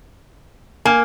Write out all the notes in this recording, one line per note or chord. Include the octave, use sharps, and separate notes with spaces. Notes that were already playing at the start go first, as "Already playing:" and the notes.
A#3 G#5 F6